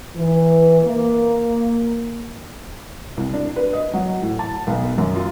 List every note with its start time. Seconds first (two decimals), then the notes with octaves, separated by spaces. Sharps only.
0.16 E3
0.82 A#3
3.17 C2
3.34 D4
3.56 B4
3.73 D#5
3.94 F#3
4.22 A2
4.39 A5
4.67 B1
4.98 F#2
5.16 F4